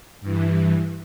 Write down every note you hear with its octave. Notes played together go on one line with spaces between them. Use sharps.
G2 E3